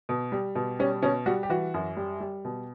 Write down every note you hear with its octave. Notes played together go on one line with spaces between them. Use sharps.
B2
G3
B2
G3 C#4
B2 C#4
G3 F#4
G4
E3 F#4
F#2
G3
G3
B2